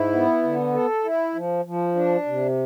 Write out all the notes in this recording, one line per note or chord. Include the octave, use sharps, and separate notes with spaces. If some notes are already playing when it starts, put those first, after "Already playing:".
Already playing: G#2 E4
B3
D3
A4
E4
F3
F3
D4
C3